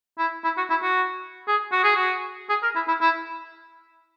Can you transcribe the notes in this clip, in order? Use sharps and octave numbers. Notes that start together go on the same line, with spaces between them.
E4
E4
F#4
E4
F#4
G#4
F#4
G#4
F#4
G#4
A#4
E4
E4
E4